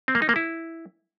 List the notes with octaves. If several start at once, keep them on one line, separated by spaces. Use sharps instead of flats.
C4
A#3
D#4
A#3
E4